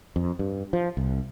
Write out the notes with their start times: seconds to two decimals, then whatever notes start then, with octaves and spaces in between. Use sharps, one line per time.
0.16 F2
0.39 G2
0.73 F3
0.97 C2